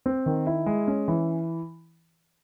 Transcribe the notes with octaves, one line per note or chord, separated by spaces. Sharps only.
C4
D#3
E4
G#3
C#4
E3